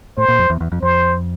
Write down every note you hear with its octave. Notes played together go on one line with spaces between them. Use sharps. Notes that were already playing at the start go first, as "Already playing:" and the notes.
A2 C5
A#2
F2
E2
E2
F2
F2 C5